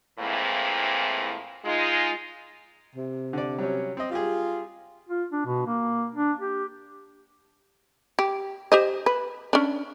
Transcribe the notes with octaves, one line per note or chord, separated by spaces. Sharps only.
A2 E3 F3 G#3 A#3 C4
G#3 D#4 F4
C3
D3 D5
F#3 G3 C#4
C4 D#5
G3 F4 G4 G#4
F4
D4
B2
A#3
D4
G4
G4
G4 C5 D#5
B4
C#4 D4